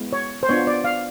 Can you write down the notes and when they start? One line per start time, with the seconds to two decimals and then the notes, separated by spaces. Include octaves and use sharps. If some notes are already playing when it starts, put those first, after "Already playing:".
Already playing: G#3 B3 E4
0.13 C#5
0.43 C5
0.49 B3 D4 F4 C#5
0.67 D5
0.84 F5